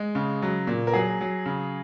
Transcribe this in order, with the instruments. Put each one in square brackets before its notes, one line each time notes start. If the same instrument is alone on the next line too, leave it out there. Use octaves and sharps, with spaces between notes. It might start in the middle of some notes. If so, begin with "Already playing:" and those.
Already playing: [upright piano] G#3
C#3
F#3
A#2
A#4
F#3 G#4
F#3
C#3